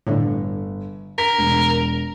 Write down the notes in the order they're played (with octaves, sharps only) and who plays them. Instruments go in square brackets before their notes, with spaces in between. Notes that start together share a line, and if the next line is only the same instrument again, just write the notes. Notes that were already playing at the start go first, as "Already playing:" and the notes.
[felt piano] G1 [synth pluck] A2 D3
[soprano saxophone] A#4 [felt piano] B6
[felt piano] E1